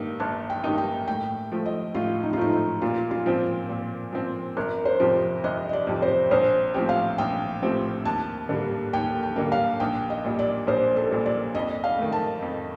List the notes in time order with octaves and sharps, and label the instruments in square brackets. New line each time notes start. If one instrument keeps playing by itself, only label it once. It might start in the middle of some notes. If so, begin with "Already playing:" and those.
Already playing: [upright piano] G2 D#3 A#3 D#4
[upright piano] G1 [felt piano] A5
[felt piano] G5
[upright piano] G2 D#3 A#3 D#4
[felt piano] G5
[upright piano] A2 [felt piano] G5
[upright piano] F3 A3
[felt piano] D#5
[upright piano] A2 [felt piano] F4
[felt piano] D#4
F4
[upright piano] F3 A3 [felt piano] D#4
[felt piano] D#4
[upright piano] A#2 [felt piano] F4
[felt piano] F4
[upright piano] F3 C4
A#2
F3 C4
[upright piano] G1 [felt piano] A#4
[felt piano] C5
[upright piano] F2 C3 F3
[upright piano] G1 [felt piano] D#5
[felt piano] D#5
D5
[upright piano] F2 C3 F3
[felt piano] C5
[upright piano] A#1 [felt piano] C5
[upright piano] A2 F3 C4 G4
[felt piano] F5
[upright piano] A#1 [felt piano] G5
[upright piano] A2 F3 C4 G4
[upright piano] D#2 [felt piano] A5
[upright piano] D3 G3 A#3
[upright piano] D#2 [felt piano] G5
[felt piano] G5
[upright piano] D3 G3 A#3
[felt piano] F5
[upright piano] A#1 [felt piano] G5
[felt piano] D#5
[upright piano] A#2 G3
[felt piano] D5
[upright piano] A#1 [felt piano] C5
[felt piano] A4
[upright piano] A#2 G3
[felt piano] D5
[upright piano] F2 [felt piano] D#5
[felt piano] F5
[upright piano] D#3 A3
[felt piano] A5
[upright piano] F2